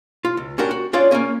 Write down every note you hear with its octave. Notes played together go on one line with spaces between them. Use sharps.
F4
C#2
C#4 D4 F#4 G4 A#4
F#4
C#4 D4 F4 G#4 C#5 D5
A#3 C4 C#4 G#4